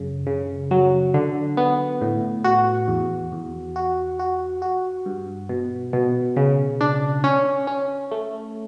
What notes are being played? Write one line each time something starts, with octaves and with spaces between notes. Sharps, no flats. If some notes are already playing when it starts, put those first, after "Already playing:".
Already playing: F#2 C#3
C#3
F#3
D3
B3
A2
F#4
E2
E2
F#4
F#4
F#4
G2
B2
B2
C#3
D4
C#4
C#4
A3